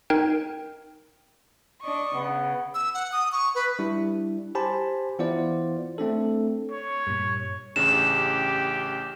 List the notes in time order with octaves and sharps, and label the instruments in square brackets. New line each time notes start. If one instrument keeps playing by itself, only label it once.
[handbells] D#4 A#4 G5
[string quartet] D4 D#5 C#6
[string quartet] C#3 [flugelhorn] B3
[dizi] E6
F#5
D#6
C#6
B4
[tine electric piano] G3 D4 E4
G4 C5 G#5 A5 B5
E3 B3 E4 F4 C5 D5
A3 C4 D4 A4
[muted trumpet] C#5
[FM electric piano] G2 A#2
[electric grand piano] A1 C#3 D4 [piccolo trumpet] G4 [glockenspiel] E7